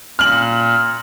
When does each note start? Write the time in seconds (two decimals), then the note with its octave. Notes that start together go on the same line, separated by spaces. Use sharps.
0.19 A#2 F6 F#7